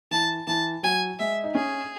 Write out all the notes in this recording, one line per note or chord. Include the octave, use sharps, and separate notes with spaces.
E3 A5
E3 A5
F#3 G#5
G#3 E5
D#4
C#4 G#4